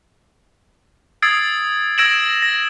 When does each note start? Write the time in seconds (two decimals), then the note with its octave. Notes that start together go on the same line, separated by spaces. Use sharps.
1.22 D#6 E6 G#6 A6 C7 D7
1.98 E6 G#6 A#6 D7 E7 F#7
2.42 A#6